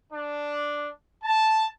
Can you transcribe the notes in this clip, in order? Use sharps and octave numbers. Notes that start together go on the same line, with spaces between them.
D4
A5